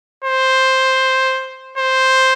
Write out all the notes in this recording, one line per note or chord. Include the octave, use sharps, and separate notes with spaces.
C5
C5